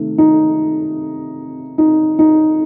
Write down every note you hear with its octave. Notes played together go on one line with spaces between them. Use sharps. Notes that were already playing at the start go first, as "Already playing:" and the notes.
Already playing: C3 D#3 A3
D#4
D#4
D#4